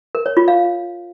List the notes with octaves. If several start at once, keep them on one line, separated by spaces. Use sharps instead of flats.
A#4
C#5
F4
F5